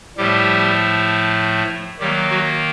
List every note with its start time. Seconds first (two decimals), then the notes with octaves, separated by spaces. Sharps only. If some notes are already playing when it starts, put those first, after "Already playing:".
0.17 A2 F3 G3 A3 G4
1.99 D#3 F#3 G3 A#3 G4
2.30 F#3 F#4